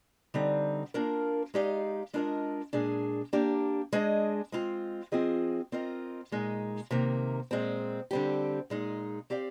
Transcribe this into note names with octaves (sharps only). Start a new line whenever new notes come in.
D3 G3 C4 D#4
A#3 D4 F4 A#4
G#3 D#4 G4 D5 F5
G#3 D4 F4 A#4 D#5
A#2 G#3 D4 G#4
A#3 D4 G4
G#3 D4 G#4 D#5
G#3 C4 F4
F3 C4 F4 G#4 D#5
C4 F4 A#4 D#5
A#2 G#3 D#4
C3 D#3 A#3
A#2 G#3 C4
D3 G3 C4 G4
A#2 G#3 D#4
C4 G4 D5 F5